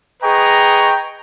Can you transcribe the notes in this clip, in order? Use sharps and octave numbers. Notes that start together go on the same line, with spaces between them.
G#4 B4 D#5 G5 A#5 C#6